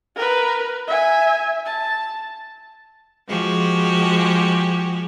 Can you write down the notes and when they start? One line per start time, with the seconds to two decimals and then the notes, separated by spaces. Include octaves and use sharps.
0.16 A#4 B4
0.88 E5 G#5
1.66 A5
3.28 F3 G#3 F#4 G4